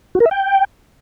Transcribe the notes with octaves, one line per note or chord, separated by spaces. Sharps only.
F#4
A#4
E5
G5